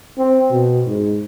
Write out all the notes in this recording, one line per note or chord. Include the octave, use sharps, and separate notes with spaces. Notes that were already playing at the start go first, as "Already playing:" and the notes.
C4
B2
G#2